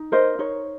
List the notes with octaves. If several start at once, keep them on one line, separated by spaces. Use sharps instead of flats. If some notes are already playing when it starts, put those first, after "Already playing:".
Already playing: D#4
A#4 C5 D#5
D#4 C#5